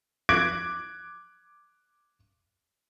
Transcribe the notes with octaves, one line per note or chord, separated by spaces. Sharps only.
D6 F#6 G#6 D7